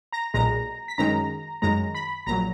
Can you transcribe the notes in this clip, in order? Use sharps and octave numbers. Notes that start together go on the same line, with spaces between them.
A#5 A#6
B1 A#2 G#3 A#5 A#6
B6
F#2 D#3 G#3 A#5 A#6
F#2 D#3 G#3 A#5 A#6
B5 B6
A#1 A#2 F#3 A#5 A#6